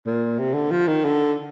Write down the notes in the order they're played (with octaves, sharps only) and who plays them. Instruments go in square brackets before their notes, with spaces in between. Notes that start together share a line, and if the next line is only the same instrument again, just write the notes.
[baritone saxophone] A#2
C3
D3
F3
D#3
D3